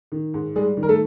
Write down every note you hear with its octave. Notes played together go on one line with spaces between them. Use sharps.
D#3
G#2
G3 G#3 G#4
D#3
A#4
A3 A4